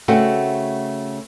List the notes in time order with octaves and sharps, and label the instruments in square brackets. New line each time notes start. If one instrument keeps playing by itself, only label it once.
[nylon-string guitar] C#3 A3 C4 F#4